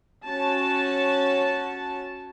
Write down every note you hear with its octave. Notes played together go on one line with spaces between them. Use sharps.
C#4 F#4 A5